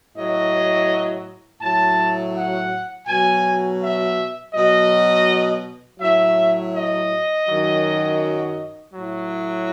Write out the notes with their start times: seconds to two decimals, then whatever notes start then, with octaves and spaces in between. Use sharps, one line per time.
0.13 A2 F#3 D#5
1.60 A2 F#3 A5
2.34 F#5
3.06 B2 F#3 G#5
3.79 E5
4.53 B2 F#3 D#5
5.99 A2 F#3 E5
6.72 D#5
7.46 F#2 D#3 F#3
8.92 A2 F#3